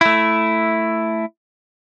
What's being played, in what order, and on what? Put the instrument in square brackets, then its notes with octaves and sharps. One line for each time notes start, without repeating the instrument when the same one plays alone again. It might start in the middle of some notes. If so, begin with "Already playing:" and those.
[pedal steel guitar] A3 E4